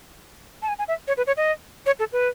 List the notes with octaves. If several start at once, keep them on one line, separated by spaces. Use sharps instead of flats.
A5
G#5
G#5
E5
C#5
B4
C#5
D#5
C#5
A4
B4